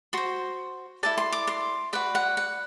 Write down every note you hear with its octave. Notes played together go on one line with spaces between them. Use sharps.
F#4 C5 C6
E4 A4 D5 A5
C6
D6
C6
F#4 B4 D5 B5
F#5
F#5